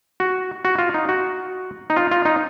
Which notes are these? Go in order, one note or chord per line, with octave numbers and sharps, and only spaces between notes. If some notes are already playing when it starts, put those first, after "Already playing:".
F#4
F#4
F4
D#4
F#4
D#4
F4
F4
D#4